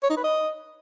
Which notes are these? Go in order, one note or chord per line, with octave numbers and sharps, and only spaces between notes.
C#5
D#4
B4
D#5